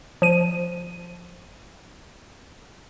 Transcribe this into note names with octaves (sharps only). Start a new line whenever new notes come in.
F3 D#7